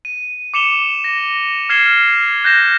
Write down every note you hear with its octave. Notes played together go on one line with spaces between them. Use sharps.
D#7
D6 C#7 E7 F7 G7
A#6
F6 G#6 C7 E7 G7
F#6 G6 A#6 E7